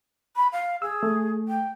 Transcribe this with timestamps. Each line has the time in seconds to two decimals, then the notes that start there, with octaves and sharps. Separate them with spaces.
0.36 B5
0.53 F5
0.82 G#4 E6
1.03 A3
1.48 G5